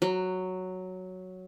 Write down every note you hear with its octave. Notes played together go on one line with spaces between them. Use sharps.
F#3